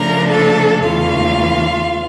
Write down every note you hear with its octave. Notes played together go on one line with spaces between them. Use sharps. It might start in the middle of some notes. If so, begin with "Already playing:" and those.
Already playing: C#3 F3 A3 D4 A#4 A#5
A4 A5
E2 C#3 E3 A3 F4 F5